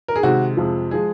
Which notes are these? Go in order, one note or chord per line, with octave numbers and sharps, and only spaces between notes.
A#4
G#4
C3 D#3 G#3 F#4
F2 C3 F3 G#3
F3 G#3 G#4